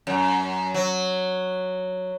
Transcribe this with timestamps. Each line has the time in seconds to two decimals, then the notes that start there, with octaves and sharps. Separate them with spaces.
0.07 F#2
0.74 F#3